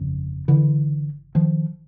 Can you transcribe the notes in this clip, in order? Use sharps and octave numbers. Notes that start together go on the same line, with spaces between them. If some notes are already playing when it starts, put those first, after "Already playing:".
Already playing: G1 F2 C#3
D3 E3
D#3 F3